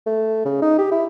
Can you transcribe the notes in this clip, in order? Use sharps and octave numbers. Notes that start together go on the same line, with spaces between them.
A3
C#3
D#4
G4
E4